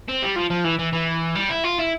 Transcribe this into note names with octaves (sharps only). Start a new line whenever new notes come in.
C4
G3
F3
F3
E3
E3
E3
G3
E4
F4
E4